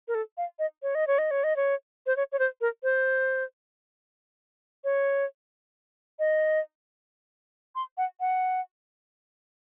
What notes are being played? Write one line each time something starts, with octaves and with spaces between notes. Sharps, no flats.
A#4
A4
F5
D#5
C#5
D#5
C#5
D#5
C#5
D#5
C#5
C5
C#5
C#5
C5
A#4
C5
C#5
D#5
C6
F#5
F#5